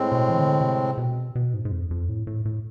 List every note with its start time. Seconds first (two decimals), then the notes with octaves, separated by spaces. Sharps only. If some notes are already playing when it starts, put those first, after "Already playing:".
Already playing: A2 G#3 C4
0.12 B2
0.30 E3
0.36 D3
0.61 C3
0.98 B2
1.35 B2
1.54 G#2
1.65 G#2
1.71 F2
1.91 F2
2.09 A2
2.27 A2
2.45 A2